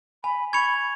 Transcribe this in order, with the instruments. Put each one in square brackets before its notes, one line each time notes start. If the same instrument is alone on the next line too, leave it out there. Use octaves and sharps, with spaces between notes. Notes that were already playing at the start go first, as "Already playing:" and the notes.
[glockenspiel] G#5 [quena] B5
[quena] B5 [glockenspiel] C#6 G#6 C#7 F7